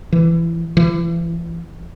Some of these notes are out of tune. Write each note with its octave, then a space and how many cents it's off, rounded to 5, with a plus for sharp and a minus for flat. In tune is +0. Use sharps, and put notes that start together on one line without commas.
E3 +20
E3 +35